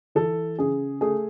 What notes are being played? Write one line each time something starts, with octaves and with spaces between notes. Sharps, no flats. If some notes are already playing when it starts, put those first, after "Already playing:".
E3 A4
C#3 G#4
A3 G#4